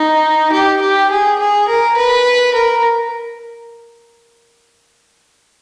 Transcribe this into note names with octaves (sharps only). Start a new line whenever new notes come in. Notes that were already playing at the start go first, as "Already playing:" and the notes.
Already playing: D#4
G4
G4
G#4
G#4
A#4
B4
A#4